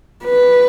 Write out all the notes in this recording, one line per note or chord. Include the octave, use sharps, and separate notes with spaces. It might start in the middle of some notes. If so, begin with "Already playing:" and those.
B4